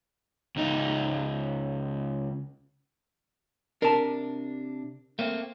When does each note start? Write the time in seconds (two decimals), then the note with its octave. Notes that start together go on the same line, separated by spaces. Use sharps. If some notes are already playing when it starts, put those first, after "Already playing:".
0.56 C#2 D#4
3.82 C3 D4 A#4 A5
5.19 A3 A#3 C4